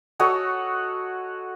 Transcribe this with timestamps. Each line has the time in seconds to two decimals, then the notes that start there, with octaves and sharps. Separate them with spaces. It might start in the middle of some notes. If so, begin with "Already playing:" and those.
0.19 F#4 A4 C#5 D#5